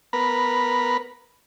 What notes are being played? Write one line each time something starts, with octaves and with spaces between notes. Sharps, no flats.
B3 A#4 B4